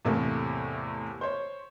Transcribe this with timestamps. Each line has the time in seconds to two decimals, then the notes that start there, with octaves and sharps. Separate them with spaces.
0.05 E2 A2 C3 A3 A#3
1.21 C5 C#5